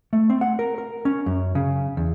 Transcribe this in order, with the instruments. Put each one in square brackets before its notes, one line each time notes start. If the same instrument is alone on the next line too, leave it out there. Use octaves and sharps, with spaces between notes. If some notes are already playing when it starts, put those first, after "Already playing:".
[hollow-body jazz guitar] A3
C4
F#5
A#4
A#4
C#4
F#2
C#3
E2